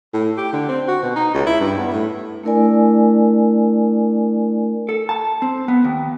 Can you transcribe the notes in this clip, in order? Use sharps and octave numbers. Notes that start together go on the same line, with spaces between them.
A2
G4
D3
C4
F#4
B2
D#4
C#2
E4
G2
B3
A2
A3 D4 E4 A#4 D5 G#5
A4
A5
C4
B3
D#2